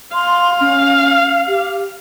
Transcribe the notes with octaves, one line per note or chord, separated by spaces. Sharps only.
F5 C6
C#4
G4